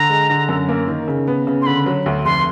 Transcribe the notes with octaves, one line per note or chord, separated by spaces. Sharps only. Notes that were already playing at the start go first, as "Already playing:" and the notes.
Already playing: D3 A#5
G#3
D3
F#2
A#3
D#3
C#3
B3
C#3
C6
D3 B5
F#3
D2
F1 C6